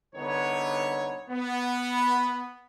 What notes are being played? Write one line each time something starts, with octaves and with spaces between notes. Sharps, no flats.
C2 D3 B3 D#4 B4 C#5
B3